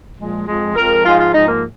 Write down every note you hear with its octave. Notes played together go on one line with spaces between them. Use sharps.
A#2 F3 G#3
F2 F3 G#3
F2 F3 G#3 A#4
G#2 F3 G#3 F4
F4
G#2 F3 G#3 D#4
A#3